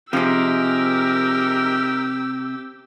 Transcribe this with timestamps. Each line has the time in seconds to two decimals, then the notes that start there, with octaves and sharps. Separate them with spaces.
0.13 C3 F3 G#3 D#4 G4 A#4 E6